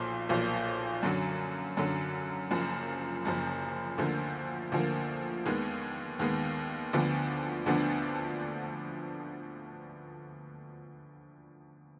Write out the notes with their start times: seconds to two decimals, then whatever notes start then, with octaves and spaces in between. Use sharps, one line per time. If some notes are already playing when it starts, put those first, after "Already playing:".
Already playing: B1 A#2 F3
0.29 B1 A#2 F3
1.03 F#2 D3 F#3
1.77 F#2 D3 F#3
2.51 F#1 F#2 F3
3.25 F#1 F#2 F3
3.98 D2 D3 F3 A#3
4.72 D2 D3 F3 A#3
5.46 D#2 D#3 G#3 B3
6.19 D#2 D#3 G#3 B3
6.93 D2 D3 F3 B3 D4
7.66 D2 D3 F3 B3 D4